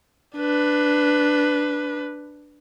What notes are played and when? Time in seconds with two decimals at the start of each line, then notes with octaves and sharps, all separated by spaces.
0.36 D4 B4